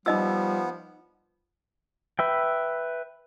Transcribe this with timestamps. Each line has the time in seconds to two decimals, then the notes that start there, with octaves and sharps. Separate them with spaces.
0.06 F3 G3 B3 D#4 D#5 E6
2.19 B4 E5 G5